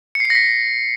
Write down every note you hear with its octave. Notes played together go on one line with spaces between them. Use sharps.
C#7
C7
C#7
A#6
B6